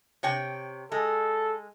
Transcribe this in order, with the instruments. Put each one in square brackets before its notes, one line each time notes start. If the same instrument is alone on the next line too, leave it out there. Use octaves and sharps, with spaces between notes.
[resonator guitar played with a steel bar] C3 C#5 G5
[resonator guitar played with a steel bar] G#3 [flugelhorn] A4